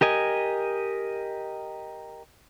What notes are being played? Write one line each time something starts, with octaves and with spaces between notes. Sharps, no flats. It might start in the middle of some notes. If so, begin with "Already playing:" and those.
G4 A#4 D#5 G#5